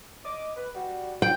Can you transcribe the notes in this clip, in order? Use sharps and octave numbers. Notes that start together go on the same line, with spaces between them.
D#5 D6
B4
G3 F#4
D2 G5